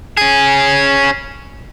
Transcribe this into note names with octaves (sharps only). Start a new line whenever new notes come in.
C#4 G#4